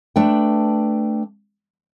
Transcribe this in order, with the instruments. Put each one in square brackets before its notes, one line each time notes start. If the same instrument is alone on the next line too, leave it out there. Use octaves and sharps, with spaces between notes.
[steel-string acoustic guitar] A3 D4 B4 G5